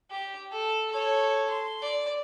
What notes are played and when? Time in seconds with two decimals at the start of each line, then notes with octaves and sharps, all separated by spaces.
0.11 G4
0.51 A4
0.91 A4 C#5
1.50 C6
1.82 D5